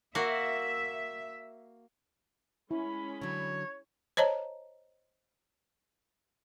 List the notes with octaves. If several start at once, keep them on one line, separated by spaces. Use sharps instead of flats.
A#3 F#4 E5
G#3 C#4 E4 B5
D3 F#3 C#5
C5 C#5 D#5 A5 A#5